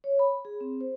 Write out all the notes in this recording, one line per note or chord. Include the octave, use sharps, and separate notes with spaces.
C#5
B5
G#4
C4
C5